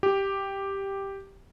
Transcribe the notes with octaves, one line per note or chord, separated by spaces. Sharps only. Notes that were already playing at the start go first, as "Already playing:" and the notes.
G4